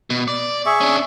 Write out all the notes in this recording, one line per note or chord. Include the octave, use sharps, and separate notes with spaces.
B2
D5
G#4 E5 C#6
C#4 D4